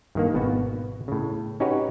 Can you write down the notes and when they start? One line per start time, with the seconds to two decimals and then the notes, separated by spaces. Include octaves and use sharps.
0.15 G2 D#3 A#3
0.34 G#1 B2 B3 F#4
1.08 A2 C#3
1.60 C#4 D#4 F#4 G4 B4 C#5